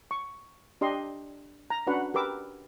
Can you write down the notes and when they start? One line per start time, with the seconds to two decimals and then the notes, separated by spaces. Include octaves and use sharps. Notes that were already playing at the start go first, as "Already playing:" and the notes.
0.11 C#6
0.81 D4 G4 D#5 C6
1.70 A#5
1.87 C#4 D4 F#4 B4 F#5
2.14 G4 A#4 B4 D6 E6